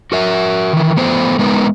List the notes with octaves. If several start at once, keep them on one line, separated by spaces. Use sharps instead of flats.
F#4 A#4 E5
D#3 E3
F3 A3 B3 C5
G#3 B3 D#4 A#4 B4